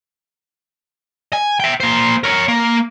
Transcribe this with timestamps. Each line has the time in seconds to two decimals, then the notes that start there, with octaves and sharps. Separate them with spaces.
1.33 G#5
1.60 E5 G5
1.80 A#3 C5
2.24 A#4 C#5
2.48 A#3